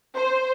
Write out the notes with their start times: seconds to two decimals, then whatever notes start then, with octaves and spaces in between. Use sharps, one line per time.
0.15 C5